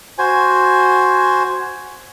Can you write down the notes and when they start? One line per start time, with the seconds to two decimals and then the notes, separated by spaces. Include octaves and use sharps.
0.18 F#4 C5 G#5